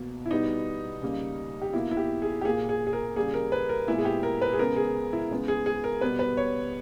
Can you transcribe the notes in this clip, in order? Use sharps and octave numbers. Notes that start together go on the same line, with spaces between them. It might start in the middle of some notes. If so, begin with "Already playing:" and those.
Already playing: B2 A#3
E4
B2 G3 B3 D#4
C#3 G3 A#3
G4
B2 A#3 E4
E4
G4
G#4
G4
A#2 A#3 G#4
G#4
G#4
A#4
C#3 G3 A#3 G#4
A#4
B4
A#4
A#2 G#3 B3 E4
G#4
G4
A#4
B4
G#4
C#3 G#3 B3 A#4
G#4
E4
C#3 G#3 B3
G#4
G#4
A#4
B2 G3 B3 B4
B4
C#5